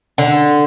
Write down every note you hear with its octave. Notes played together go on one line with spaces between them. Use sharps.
D3